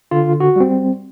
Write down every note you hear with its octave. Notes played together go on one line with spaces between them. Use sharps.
D3 F4
F#4
G3 C4